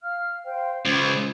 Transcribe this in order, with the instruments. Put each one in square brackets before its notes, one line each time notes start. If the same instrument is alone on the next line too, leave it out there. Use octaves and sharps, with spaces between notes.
[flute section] F5 F6
C5 F5 G5
[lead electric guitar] C#2 [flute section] C5